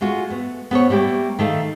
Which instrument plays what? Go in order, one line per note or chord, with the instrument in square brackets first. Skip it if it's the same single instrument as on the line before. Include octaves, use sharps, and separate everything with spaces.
[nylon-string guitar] G#3 A3 F4 F#4
A3 B3
B3 A4 C5 C#5
G3 A3 A#3 G4
D#3 A3 A4 F5